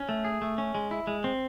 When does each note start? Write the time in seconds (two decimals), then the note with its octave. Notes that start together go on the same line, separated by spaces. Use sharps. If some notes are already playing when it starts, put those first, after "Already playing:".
Already playing: C#4
0.09 A3
0.24 G#4
0.42 A3
0.58 C#4
0.75 G#3
0.91 E4
1.07 G#3
1.24 C4